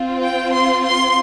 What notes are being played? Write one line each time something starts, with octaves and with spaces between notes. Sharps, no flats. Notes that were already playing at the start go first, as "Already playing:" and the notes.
Already playing: C4 F4
G5
C6
C6